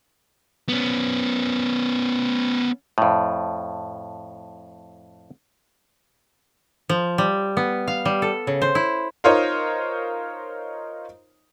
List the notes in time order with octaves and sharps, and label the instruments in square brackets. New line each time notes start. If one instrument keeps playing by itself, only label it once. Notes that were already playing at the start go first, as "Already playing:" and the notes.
[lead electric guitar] B3 C#4
[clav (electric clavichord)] F2 A2
[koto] F3
G3
B3
F5
G3
A4
C#3
C5
E4
[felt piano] D#4 F4 A#4 C5 C#5 D#5